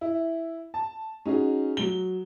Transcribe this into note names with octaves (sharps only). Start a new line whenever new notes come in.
E4
A5
C#4 D#4 F#4 G#4
F#3 G7